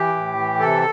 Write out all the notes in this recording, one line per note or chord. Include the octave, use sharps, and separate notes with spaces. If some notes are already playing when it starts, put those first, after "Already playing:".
Already playing: E3 G4
A2
E3
C3 A4